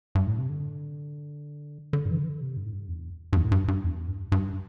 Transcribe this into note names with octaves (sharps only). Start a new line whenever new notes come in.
G2
A2
C3
D3
D3
G2
E3
D3
E3
D3
C3
G2
A2
G2
E2
G2
E2
A2
G2
G2
E2
G2
G2